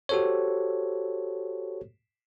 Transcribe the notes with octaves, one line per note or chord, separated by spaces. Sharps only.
F#4 G4 A4 C5 C#5